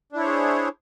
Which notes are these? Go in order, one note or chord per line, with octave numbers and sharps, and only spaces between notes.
D4 E4 G#4 C5 C#5